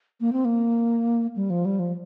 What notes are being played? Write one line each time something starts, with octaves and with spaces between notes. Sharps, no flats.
A#3
C4
A#3
G3
F3
G3
F3